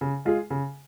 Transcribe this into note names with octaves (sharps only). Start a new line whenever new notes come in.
C#3
G#3 F4 G#4
C#3